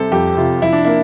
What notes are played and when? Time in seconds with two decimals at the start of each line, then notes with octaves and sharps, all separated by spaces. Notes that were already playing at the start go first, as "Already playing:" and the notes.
Already playing: C3 G3 C4 A4
0.11 F2 G4
0.37 C3 F4
0.62 F3 E4
0.72 D4
0.84 A#3 E4